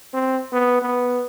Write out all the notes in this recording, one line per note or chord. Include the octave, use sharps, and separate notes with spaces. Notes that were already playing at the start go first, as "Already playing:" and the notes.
C4
B3
B3